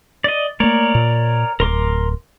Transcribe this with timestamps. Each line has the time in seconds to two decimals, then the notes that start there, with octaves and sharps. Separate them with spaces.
0.24 D5 D#5
0.60 A3 A#3 A#4 C#5 D5
0.95 A#2
1.60 D1 A#4 C6 D6